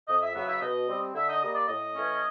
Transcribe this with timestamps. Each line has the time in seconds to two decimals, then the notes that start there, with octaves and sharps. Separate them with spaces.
0.08 F2 D#5
0.22 E5
0.35 C#3 F#3 B3 E5
0.48 E5
0.62 B2 D#5
0.88 G3 C4
1.15 D3 E5
1.28 D#5
1.41 G3 A#3 D#5
1.55 D5
1.68 A2 D#5
1.94 E3 A3 C#4